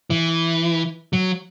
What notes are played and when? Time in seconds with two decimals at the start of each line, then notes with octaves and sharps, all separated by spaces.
0.10 E3
1.13 F#3